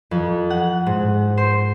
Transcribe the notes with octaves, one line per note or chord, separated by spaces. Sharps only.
F2
F#5
G#2
C5